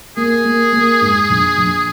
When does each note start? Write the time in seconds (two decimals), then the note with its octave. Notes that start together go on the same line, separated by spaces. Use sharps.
0.17 A#3 G#4
0.45 A#3
0.72 A#3
1.01 G#2
1.30 A#1
1.57 A#1